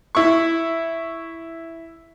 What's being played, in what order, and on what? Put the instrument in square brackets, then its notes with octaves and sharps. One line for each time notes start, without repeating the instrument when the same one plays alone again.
[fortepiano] E4 C#6